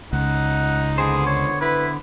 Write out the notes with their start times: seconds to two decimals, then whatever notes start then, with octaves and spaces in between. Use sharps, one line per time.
0.13 C#2 D#4 F#5
0.98 D3 B3 G#4 C5
1.26 C#5
1.61 E4 B4